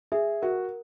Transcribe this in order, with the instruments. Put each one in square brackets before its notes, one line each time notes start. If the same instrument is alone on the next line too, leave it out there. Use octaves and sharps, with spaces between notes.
[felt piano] G#4 [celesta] E5
[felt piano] F#4 [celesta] A#4